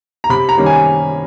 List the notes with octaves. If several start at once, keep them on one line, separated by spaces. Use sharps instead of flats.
A#5
C3 B5
A#5
D#3 G3 A#3 C#4
G#5